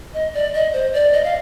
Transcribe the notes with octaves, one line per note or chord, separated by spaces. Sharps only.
D#5
D5
D#5
C5
D5
D#5
F5